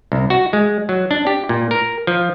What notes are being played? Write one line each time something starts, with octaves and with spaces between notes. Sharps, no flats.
C2
F#4
G#3
F#3
D4
G4
A#2
A#4
F3